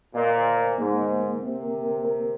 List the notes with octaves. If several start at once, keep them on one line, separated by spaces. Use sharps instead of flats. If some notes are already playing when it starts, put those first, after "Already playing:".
A#2 D#5
C5
C5
G#2 A#3
A#3
A#3
C3 C4
A#4
A#4
A#4